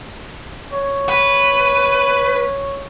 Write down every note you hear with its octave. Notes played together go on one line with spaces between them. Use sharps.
C#5
B4